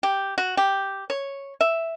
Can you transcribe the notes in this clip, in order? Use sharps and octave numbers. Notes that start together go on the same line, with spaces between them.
G4
F#4
G4
C#5
E5